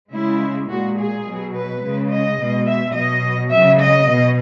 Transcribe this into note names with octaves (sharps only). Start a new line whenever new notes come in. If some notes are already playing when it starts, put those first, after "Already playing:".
C#3 G#3 E4
A#2 G#3 F#4
G#4
B2 F#3
B4
C#3 G#3
D#5
B2 G#3
E5
B2 F#3 D#5
C#3 F#3 E5
D#5
B2